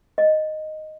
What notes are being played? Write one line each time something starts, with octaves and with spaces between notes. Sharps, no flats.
D#5